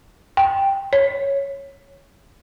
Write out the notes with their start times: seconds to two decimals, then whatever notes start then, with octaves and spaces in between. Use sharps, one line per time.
0.37 G5
0.93 C#5